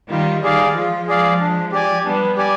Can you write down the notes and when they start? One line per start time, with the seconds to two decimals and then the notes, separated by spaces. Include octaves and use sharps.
0.10 D#3 G3 F4
0.43 D#3 G3 G#4 D5 F5
0.75 F3 G#3 F4
1.07 G#4 D5 F5
1.40 D4
1.72 G4 D5 G#5
2.04 G3 B3 D4
2.37 G4 D5 G#5